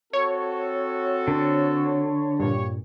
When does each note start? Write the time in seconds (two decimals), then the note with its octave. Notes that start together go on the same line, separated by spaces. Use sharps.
0.13 C4 F#4 A4 C#5
1.28 D3
2.40 G2 A#2 G4 C#5